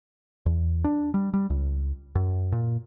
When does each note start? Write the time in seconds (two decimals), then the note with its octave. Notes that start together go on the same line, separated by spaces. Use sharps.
0.46 E2
0.84 D4
1.14 G3
1.34 G3
1.50 C#2
2.15 F#2
2.52 A#2